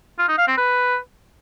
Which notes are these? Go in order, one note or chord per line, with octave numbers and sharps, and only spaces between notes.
F4
D#4
F5
C4
B4